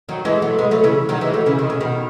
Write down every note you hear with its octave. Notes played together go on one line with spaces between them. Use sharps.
D#3 F#3
E3 G#3
F#3 A3
G#3 B3
F#3 A3
C#3 E3
D#3 F#3
E3 G#3
F#3 A3
C#3 E3
D#3
C#3
B2 D#3